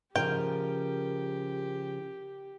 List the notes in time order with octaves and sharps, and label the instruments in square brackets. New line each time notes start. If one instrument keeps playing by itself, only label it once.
[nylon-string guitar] C#3 F3 [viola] G4 [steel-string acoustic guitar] A#4 [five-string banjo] G5